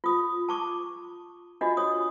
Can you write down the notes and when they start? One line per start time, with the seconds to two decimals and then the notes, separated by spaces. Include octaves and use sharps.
0.04 F4 D#6
0.49 A5 C#6 D6
1.61 D4 F4 F#4 D#5
1.77 C#5 D#6